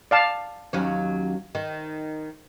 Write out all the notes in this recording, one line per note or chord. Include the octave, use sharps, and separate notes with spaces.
D5 F5 A5
D#2 F#3 C#4
D#3